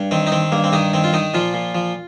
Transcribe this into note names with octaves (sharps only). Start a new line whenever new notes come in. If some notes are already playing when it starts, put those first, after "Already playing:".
Already playing: G2
D#3 C4
D#4
D#3 C4
G2 A#3
C4
G2 D#3 D#4
D#3 C4
F4
D#3 D#4
A#2 F3 F4
A#2
F3